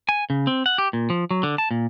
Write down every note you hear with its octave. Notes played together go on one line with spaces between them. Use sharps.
G#5
C#3
C4
F#5
G4
A#2
F3
F#3
D3
A5
A#2